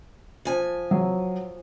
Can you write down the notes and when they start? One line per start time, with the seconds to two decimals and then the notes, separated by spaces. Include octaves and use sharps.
0.45 F3 G#5
0.91 F#3